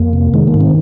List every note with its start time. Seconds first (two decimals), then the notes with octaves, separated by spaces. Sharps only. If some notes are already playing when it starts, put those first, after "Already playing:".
Already playing: F2 A#3
0.13 C3
0.34 D#3 G#3
0.47 A#3
0.54 G#2
0.61 C4